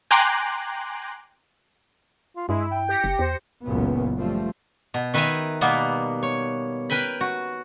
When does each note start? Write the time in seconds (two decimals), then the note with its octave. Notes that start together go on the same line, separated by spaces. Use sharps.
0.11 G5 G#5 A#5 C6 D6 F#6
2.36 F4
2.49 G2 G#3 E4
2.72 G5
2.89 G4 G6 A#6 C#7
3.04 F#1
3.19 E2 C5
3.64 F#1 C#2 A#2 B3
4.19 F3 G3 A3 C4
4.94 B2
5.14 D#3 B4 E5 G5 G#5 A#5
5.61 B2 G3 A#3 B3
6.23 C#5
6.90 A#4 B4 G5 G#5 B5
7.21 F#4